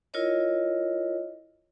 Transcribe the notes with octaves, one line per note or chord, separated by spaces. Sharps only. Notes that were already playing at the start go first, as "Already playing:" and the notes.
E4 F4 A#4 C#5 D#5